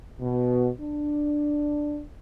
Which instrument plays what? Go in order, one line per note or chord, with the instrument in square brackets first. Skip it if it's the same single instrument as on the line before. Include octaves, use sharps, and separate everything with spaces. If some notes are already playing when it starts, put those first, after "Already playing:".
[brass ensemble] B2
D4